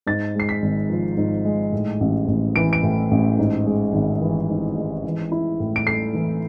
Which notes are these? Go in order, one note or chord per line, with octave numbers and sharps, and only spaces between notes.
G#2 A6
G#3 C7
B6
G#1
F3
G#2
G#3
A2
A1
A1
E3 D7
D7
A2
A1
G#2
G#3
G#1
E3
G#2
G#3
E3
E4
A2
D7
A3 C7
E3